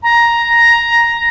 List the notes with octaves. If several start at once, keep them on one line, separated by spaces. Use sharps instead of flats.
A#5